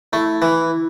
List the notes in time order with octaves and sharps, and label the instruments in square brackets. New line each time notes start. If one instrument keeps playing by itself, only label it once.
[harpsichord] A3 [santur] E4
[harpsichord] E3